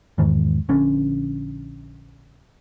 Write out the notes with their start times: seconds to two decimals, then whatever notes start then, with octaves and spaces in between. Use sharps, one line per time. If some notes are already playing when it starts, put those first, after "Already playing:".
0.18 E2 G#2 D#3
0.69 A#1 D3 C#4